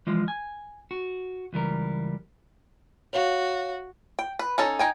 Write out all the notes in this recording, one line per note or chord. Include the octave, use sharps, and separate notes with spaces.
E3 F3 G#3
G#5
F#4
C#2 E3 G3 A#4
F#4 C#5 F5
G5
B4
C#4 D#4 A4
D#4 G5 G#5